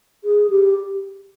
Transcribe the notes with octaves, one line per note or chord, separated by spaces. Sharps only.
G#4
G4